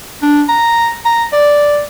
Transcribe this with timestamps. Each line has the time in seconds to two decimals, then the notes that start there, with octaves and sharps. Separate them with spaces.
0.23 D4
0.49 A#5
1.05 A#5
1.33 D5